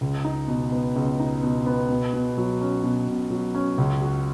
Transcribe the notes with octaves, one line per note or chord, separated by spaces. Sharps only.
C#2
D#4
B2
B3
C#2
D#4
B2
B3
B2
B2
F#3
C#4
B2
B2
F#3
C#4
C#2
F#4